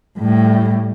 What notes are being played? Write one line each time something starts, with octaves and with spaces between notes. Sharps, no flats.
A2 G3